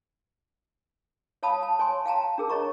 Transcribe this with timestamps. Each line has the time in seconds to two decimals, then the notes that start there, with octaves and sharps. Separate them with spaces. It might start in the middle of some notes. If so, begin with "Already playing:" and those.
1.43 C#5 F5 A5 B5 D#6
1.63 A5
1.79 C#5 G#5 C6
2.06 F5 G5 A5 A#5
2.38 D4 G#4 A#4
2.49 C#5 D#5 A#5 C#6